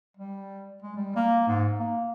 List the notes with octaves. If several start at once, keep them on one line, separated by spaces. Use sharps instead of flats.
G3
G#3
G3
A#3
G#2
A#3